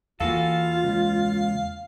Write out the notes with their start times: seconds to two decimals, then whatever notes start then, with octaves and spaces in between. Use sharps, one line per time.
0.20 E2 E3 A#3 F4 F#4 A4 F5
0.84 C#2